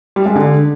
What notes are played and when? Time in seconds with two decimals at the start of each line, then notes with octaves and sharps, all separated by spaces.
0.16 G3
0.26 G#3
0.35 D3